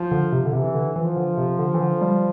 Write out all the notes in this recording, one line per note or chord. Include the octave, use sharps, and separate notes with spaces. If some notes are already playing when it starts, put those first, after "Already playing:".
Already playing: F3
D3
C3
D3
C3 E3
D3
E3 F3
D3
C3
D3
E3
D3
G3